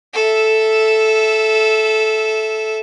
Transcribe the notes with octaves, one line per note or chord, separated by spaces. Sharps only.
A4 E5